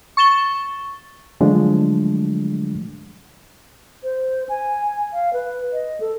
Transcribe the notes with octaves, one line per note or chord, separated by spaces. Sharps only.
C#6 A6 E7 G7
D3 F3 F#3 G#3 A3 D4
C5
G#5
F5
B4
D#5
A4